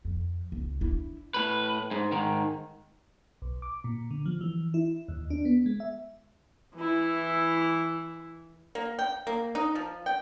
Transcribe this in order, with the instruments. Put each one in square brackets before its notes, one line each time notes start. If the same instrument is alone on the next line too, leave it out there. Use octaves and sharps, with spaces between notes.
[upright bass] F2
C#2
D4 E4
[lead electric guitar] A2 B4
G#2
G#2 D#3
[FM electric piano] B1
D6
A#2
D3
F3
E3
E4
D#2
D4
B3
G#3
E5
[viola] E3 E4
[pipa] A#3
G5
A#3
D#4
F3
G5